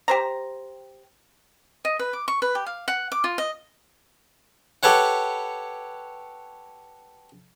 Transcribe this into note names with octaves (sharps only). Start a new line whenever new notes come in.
G4 C5 A#5
D#5
B4
D6
C#6
B4
G4
F5
F#5
D6
F4
D#5
G4 A4 B4 C#5 F#5